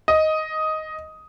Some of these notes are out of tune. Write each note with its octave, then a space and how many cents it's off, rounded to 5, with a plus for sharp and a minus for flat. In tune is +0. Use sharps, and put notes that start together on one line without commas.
D#5 +5